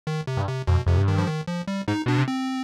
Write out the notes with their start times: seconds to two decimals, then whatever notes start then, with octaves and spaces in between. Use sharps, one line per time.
0.07 D#3
0.27 C3
0.37 G2
0.48 C3
0.67 F2 B2
0.86 F2 C3
0.98 G2
1.08 D#3
1.18 F3
1.27 D#3
1.48 F3
1.68 G3
1.88 G#2 D#4
2.06 B2 D4
2.18 C3
2.28 C4